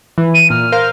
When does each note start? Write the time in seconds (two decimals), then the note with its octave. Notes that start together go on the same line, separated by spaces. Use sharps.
0.18 E3
0.34 D#7
0.50 A#2 F6
0.72 A#4 C5 F5